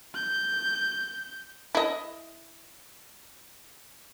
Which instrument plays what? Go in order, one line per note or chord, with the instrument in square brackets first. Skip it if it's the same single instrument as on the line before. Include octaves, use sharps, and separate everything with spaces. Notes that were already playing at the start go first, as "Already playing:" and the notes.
[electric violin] G6
[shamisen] E4 D#5